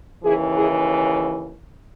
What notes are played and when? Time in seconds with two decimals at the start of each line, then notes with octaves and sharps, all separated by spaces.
0.24 D#2 C#3 E3 E4 G#4
0.57 E4 G#4